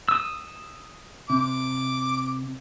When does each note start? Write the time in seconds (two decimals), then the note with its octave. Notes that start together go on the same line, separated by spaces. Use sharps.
0.09 D#6 E6
1.30 C3 D6